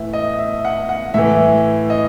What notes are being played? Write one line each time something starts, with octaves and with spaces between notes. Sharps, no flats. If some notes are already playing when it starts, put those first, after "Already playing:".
Already playing: A2 E3 E5
D#5
E5
F#5
F#5
A2 E3 E5
D#5